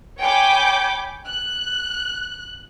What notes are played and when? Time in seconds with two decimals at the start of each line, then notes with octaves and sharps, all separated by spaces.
0.20 C#5 G5 G#5 B5 D6 G6
1.26 F#6